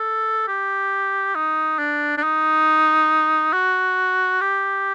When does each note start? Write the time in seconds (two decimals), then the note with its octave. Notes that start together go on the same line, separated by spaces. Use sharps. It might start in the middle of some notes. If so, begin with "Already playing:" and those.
Already playing: A4
0.48 G4
1.35 D#4
1.79 D4
2.18 D4
2.23 D#4
3.53 F#4
4.41 G4